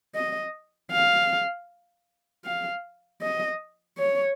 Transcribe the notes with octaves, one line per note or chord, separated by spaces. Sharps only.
D#5
F5
F5
D#5
C#5